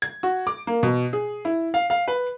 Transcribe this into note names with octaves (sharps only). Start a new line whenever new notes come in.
G#6
F#4
D6
A#3
B2
G#4
E4
F5
F5
B4